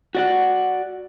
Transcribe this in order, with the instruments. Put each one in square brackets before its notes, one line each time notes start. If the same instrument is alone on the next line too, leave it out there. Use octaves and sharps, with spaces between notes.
[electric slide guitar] F#4 D5 F#5